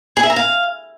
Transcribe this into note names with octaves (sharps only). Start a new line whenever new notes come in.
G#4
E5
A#5
F5